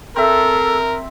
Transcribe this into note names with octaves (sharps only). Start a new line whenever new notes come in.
C4 A4 A#4 E5